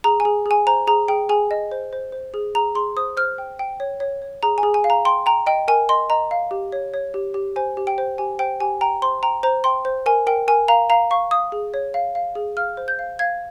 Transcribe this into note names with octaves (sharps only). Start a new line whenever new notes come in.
G#4 A#5
G#5
G#4
G#4
G#5
C5 A#5
G#4 A#5
G#4 G5
G#4 G#5
D#5
C5
C5
C5
G#4
G#4 A#5
G#4 C6
C5 D#6
C5 F6
G5
G5
C#5
C#5
C#5
G#4 A#5
G#5
G#4
G#5
F5
A#5
G5 C6
G5 A#5
D#5 G5
A#4 G#5
D#5 C6
D#5 A#5
F5
G4
C#5
C#5
G4
G4
C5 G#5
G4
G5
C5
G4 G#5
C5 G5
G4 G#5
G5 A#5
C5 C6
G5 A#5
C5 A#5
G5 C6
C5
A#4 G#5
A#4 G5
A#4 G#5
F5 A#5
F5 A#5
F5 C#6
F5 D#6
G#4
C#5
F5
F5
G#4
F5 F6
C5
G6
F5
F5 G#6